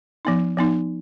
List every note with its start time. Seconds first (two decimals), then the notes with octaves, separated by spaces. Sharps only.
0.25 F3 B3 D#4
0.57 F3 B3 D#4